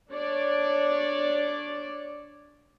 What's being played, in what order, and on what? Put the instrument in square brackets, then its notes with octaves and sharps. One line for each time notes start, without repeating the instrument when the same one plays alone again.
[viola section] D4 C#5 D5